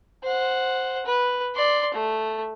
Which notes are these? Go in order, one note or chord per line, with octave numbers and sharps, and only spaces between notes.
C5 F#5
B4
D5 C6
A3